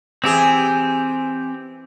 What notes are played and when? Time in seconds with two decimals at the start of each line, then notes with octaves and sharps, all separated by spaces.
0.24 E3 C4 G4 G#4